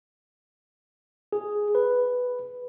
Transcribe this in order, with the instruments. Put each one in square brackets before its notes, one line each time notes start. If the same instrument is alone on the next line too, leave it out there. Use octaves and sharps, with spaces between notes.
[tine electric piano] G#4
B4